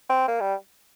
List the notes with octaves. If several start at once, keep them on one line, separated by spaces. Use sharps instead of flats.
C4
A#3
G3